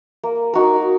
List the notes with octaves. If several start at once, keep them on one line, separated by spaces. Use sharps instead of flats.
A#3
D#4 F#4 A#4